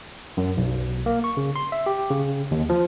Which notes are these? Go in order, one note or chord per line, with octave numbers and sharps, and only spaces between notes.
F#2
B1
A#3
C#6
C#3
C6
E5
G4
C#3
D#2
F3